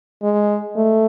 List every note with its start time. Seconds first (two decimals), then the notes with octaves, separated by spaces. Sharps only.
0.23 G#3
0.76 A3